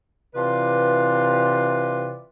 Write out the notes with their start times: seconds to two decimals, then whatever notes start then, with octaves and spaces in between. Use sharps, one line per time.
0.35 C3 E3 F4 B4 D5